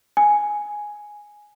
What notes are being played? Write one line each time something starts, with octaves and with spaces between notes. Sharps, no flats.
G#5